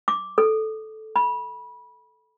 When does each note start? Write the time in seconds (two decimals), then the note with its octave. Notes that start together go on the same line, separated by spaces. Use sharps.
0.08 D6
0.38 A4
1.16 B5